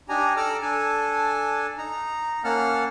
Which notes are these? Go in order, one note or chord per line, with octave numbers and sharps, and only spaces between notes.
D4 D#4 G4 G#5 A#5
A4 D5 A#5 D6 E6 F6
D4 A4 G#5 A5
D#4 A#5
A#3 C#4 F#5 A5 F6